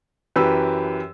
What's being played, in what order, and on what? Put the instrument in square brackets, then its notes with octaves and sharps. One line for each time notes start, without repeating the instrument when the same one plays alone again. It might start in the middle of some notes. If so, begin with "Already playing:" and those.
[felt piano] F#2 E3 G4 B4 E6